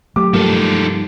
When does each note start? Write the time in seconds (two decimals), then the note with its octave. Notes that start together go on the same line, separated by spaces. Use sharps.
0.16 F#3 A3 G4 D6
0.34 G2 D#3 F3 A#3 A4